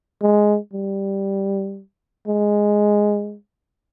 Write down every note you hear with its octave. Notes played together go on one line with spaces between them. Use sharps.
G#3
G3
G#3